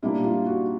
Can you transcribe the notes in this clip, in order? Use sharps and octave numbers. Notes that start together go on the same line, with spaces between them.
A#2 G3 A#3 D4 E4
F4
F#4